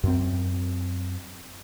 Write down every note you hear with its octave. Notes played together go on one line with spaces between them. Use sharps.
F#2 C4